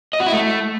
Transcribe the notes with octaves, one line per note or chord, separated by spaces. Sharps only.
D#5
F#4
E4
A3